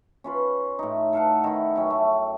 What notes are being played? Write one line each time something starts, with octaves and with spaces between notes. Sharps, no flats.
C#4 F4 B4
A2 D#4
A4 F5 F#5
D#3 E4
F#2 C#4 G5
A3